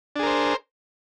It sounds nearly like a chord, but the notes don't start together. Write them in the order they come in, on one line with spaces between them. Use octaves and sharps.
D4 G#4 A#4 C5